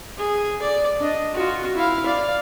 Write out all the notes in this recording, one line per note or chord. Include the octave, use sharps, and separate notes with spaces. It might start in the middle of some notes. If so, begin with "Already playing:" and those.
G#4
D5
D4 D#5
F4 F#4
E4 F5
D5 F5